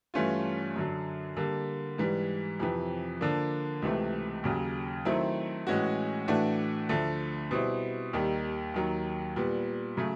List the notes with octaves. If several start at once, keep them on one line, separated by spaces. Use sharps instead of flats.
G2 E3 A3 C#4 F4
F#2 D3 F#3
D3 G3 A#3
G#2 E3 G3
F2 C3 E3
D3 F3 A#3 D4
C#2 C3 E3 A3
D#2 C#3 F#3
D#3 F#3 A3 C4 E4
A2 E3 G#3 C#4 F#4
A2 E3 A3 D4 F#4
D2 D3 F3 A3
B2 G3 C4 E4
D#2 D#3 G3
D#2 D#3 F#3
A#2 G3 B3
C#3 F#3 A3